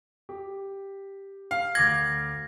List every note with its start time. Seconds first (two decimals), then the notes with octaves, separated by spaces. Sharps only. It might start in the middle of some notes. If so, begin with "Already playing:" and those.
0.29 G4
1.51 F5
1.75 D2 D6 G#6 A#6 F#7